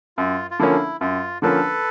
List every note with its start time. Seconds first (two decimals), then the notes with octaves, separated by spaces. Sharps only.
0.18 F#2 F4
0.51 F4
0.59 D3 F3 A#3 C#4 E4
1.01 F#2 F4
1.42 D3 F3 A#3 C#4 A4 B4